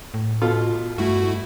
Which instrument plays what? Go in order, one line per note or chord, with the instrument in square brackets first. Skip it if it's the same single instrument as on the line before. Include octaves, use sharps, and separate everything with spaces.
[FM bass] A2
[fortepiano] B2 F4 A4
[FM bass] G2 [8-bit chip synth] A3 E4 F#4